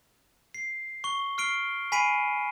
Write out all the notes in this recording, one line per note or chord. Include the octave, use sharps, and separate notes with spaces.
C7
C#6 G7
F6 C7 D7 G7
G#5 B5 B6 C7 D7 D#7